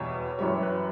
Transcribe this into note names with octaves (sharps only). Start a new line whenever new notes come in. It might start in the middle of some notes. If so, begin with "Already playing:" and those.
Already playing: E2 B2 G3 C#5
F#2 E3 G3 C#5
B4